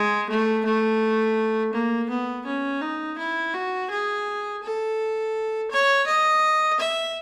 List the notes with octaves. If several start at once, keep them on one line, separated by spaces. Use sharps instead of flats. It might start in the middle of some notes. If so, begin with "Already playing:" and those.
Already playing: G#3
A3
A3
A#3
B3
C#4
D#4
E4
F#4
G#4
A4
C#5
D#5
E5